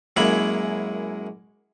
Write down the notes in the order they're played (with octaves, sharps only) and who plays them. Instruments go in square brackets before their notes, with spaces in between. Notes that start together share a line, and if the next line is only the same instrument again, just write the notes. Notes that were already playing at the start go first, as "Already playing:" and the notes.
[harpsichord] F#2 G#3 A#3 E4 C#5 B5